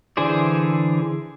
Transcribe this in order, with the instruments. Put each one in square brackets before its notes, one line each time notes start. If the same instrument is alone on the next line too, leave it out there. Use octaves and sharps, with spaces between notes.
[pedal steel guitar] D3 E3 G#4 C5 D5